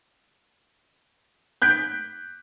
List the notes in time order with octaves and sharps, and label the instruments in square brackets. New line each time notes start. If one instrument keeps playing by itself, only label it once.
[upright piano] F#6 G6 B6 D7